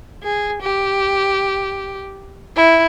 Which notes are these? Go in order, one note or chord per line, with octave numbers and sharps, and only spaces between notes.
G#4
G4
E4